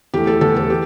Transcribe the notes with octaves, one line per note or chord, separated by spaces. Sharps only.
E2 E3 A3 G4
A4
E2 E3 A3 A4
A4
G4